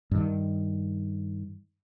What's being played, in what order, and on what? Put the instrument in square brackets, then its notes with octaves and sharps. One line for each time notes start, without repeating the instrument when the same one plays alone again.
[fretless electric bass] G2 D#3